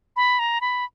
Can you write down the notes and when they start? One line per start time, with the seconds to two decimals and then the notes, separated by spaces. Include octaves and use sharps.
0.16 B5
0.39 A#5
0.61 B5